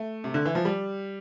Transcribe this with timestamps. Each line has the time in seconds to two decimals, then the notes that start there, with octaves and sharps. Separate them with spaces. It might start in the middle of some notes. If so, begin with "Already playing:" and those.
Already playing: A3
0.24 C3
0.34 D3
0.45 E3
0.55 F3
0.65 G3